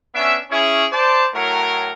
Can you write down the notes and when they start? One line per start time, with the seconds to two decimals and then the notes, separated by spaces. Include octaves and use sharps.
0.14 B3 C#4 D4 E5
0.50 C#4 E4 G#4
0.91 C5 D5 A5
1.33 A2 F#3 A#4